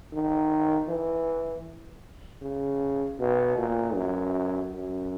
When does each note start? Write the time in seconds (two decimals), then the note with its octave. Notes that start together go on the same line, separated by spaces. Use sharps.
0.13 D#3
0.88 E3
2.42 C#3
3.19 B2
3.58 A#2
3.95 F#2
4.73 F#2